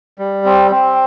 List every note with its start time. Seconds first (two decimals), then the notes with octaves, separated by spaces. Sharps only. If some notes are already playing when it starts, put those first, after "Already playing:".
0.19 G3
0.45 C4
0.71 C4